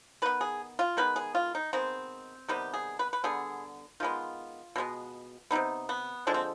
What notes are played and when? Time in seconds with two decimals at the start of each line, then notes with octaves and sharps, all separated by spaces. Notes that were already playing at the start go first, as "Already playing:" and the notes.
0.22 D#3 B3 B4
0.41 G#4
0.79 F4
0.97 D#3 G#3 B3 B4
1.16 G#4
1.35 F4
1.55 D#4
1.73 D#3 G#3 B3 C4
2.48 C3 D#3 G3 B3 G4
2.73 G#4
2.99 B4
3.13 B4
3.24 D3 G3 B3 G#4
4.00 D#3 G#3 B3 F4
4.76 B2 G#3 B3
5.51 C3 F3 B3 D#4
5.89 B3
6.27 D3 F3 G#3 D4
6.34 C4